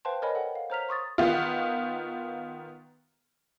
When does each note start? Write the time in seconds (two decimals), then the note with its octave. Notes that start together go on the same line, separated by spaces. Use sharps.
0.05 B4 C5 F5 G5 A5 C6
0.22 A#4 B4 C#5 D#5 G#5 B5
0.35 A4 B4 D5 F#5 G5
0.55 F5
0.70 C5 C#5 A#5 F6 B6 F7
0.89 C6 C#6 D#6 A6
1.18 D#3 B3 F4